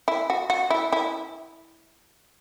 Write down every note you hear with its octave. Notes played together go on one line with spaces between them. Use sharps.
E4
F#4
F#4
E4
E4